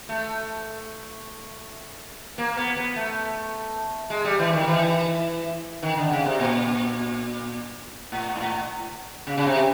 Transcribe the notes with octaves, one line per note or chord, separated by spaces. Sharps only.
A3
A#3
B3
B3
A3
G#3
G3
E3
D#3
E3
D#3
D3
C#3
C3
A#2
A2
G#2
A2
C#3
C#3
C3